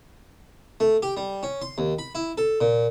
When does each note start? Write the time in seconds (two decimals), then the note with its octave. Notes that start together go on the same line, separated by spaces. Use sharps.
0.80 A3
1.03 G4
1.17 G3
1.43 C#4
1.62 C6
1.78 D#2
1.99 B5
2.15 E4
2.38 A4
2.61 A#2